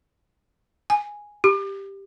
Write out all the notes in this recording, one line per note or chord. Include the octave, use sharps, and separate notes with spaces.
G#5
G4